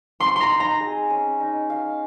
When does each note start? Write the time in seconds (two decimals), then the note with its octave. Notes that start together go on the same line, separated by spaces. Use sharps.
0.20 C4 C6
0.36 A#5 C6
0.50 D#4
0.60 A#5
0.80 G#4
1.10 C#4
1.40 D#4
1.70 F5